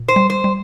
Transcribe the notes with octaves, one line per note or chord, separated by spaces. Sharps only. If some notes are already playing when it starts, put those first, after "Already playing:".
Already playing: A#2
C5
G3
C5
G3